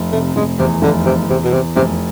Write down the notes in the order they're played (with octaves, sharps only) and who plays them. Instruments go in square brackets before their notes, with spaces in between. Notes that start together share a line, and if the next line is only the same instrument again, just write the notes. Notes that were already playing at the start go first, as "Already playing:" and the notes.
Already playing: [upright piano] F1
[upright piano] C3 [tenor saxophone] A3
[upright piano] F1 [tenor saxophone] G#3
[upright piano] E2 [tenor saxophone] C3
[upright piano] F1 [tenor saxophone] D3
[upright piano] E2 [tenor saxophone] C3
[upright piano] E2 [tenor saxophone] C3
[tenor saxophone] B2
[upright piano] E2 [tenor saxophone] C3
[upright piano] F1 [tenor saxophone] C3